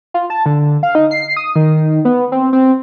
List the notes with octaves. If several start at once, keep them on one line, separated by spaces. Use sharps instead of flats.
F4
A5
D3
F5
D#4
C7
D#6
D#3
B3
C4
C4